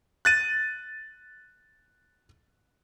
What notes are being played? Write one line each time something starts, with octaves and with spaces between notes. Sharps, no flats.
F#6 A6 D#7